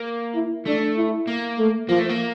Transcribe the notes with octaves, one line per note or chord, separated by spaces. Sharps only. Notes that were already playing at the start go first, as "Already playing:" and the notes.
Already playing: A#3
E4
A3 D4
E4
A#3
A3
F3 A#3
A3
A#3